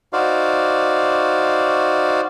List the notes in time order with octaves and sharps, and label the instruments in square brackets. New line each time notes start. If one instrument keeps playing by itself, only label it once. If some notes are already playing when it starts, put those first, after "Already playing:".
[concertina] D#4 F#4 C5 D5 F5